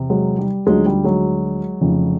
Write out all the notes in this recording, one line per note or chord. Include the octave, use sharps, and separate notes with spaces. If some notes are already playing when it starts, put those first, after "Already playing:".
Already playing: E2 C3
F#3 G#3
G3
D2 D3 F3 F#3 G#3
G3
F#3 G#3
F1 F2 C#3